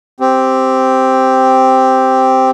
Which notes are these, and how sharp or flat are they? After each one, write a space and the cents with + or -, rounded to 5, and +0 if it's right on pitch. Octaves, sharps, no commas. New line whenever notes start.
C4 +0 G4 +0